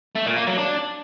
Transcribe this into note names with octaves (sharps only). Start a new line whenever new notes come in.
A3
A#2
A#3
F#3
D4